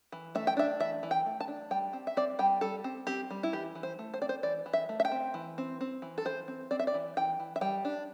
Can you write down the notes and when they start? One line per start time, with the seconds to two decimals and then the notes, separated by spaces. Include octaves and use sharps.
0.12 E3
0.35 A3 E5
0.47 G5
0.57 D4 E5
0.80 E3 E5
1.03 E3
1.11 G5
1.26 A3
1.40 A5
1.48 D4
1.71 G3 G5
1.93 C4
2.07 E5
2.17 C4 D5
2.39 G3 G5
2.61 G3 A4
2.84 C4
3.07 C4 G4
3.30 G3
3.43 E4
3.53 E3 G4
3.75 E3
3.83 C5
3.99 A3
4.14 C5
4.21 C4 D5
4.29 C5
4.43 E3 D5
4.66 E3
4.73 E5
4.89 A3
5.00 E5
5.05 G5
5.12 C4
5.34 E3
5.58 C4
5.81 C4
6.02 E3
6.18 A4
6.25 E3 C5
6.48 C4
6.71 C4 D5
6.79 E5
6.87 D5
6.94 E3
7.17 E3 G5
7.40 E3
7.56 E5
7.61 G3 G5
7.85 D4